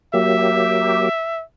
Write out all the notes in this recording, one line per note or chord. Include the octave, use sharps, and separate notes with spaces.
F#3 A#3 G4 E5